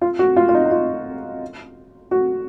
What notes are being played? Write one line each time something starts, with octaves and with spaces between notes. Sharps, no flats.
F4
F#4
F4
F4
D#4
D#4
F4
F#4